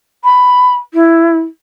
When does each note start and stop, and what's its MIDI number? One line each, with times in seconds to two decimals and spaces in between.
0.24 0.73 83
0.94 1.38 64